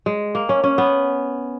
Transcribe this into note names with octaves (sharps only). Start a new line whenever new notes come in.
G#3
A#3
C#4
C#4
B3